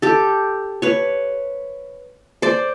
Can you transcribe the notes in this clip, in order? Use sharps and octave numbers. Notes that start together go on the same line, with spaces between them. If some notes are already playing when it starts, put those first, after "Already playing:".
G4 A4
B4 C#5
C5 D5